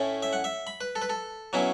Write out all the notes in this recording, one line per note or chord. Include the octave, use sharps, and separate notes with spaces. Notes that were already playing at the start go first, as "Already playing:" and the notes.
Already playing: A2 A3 C#4 E4
E5
F#5
E5
B5
B4
A4
B4
A4
B2 F#3 C#4 E4